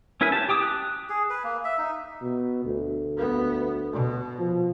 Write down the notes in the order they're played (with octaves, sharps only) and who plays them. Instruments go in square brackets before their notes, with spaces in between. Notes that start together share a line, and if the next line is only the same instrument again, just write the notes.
[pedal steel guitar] C#4 E4 A#4 B4 G#5
G4 A5
G4 G5 D6 D#6
F#6
[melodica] G#4
B4
A#3
E5
D#4
[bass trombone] B2
D2
[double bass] B3
B2
[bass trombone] F3